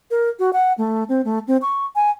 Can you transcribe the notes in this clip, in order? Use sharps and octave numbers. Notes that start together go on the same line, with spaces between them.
A#4
F#4
F#5
A3
C4
A3
C4
C#6
G#5